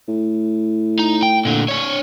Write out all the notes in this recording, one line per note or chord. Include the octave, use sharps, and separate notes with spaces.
A2
D#4
G5
A#2 D3
D4 C#5